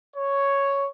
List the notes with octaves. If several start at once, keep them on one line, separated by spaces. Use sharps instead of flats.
C#5